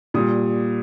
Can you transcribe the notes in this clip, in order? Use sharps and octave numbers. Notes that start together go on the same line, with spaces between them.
A#2 G3 D#6